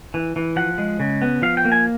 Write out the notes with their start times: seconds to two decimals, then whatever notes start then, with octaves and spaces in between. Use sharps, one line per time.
0.14 E3
0.36 E3
0.56 F3 F#5
0.78 G#3
1.00 C#3
1.22 B3
1.42 F3 F5
1.57 G5
1.65 A#3
1.72 G#5